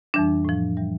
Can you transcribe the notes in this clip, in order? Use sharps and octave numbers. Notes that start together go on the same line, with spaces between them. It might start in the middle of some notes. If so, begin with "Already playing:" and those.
F2 E3 G3 D4
A2 F3
E3 G3